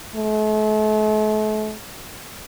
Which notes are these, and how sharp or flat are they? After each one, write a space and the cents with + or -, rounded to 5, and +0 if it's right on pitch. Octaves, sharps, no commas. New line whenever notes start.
A3 -40